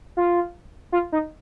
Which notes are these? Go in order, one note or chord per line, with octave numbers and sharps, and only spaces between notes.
F4
F4
D#4